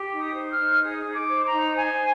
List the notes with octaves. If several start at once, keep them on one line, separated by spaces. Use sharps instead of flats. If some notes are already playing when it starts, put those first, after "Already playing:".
Already playing: G4
D#4
D#6
C5
D#6
F6
D#4
G#4 D#6
D#4
D6
C5
A#5
D#4
C5 G#5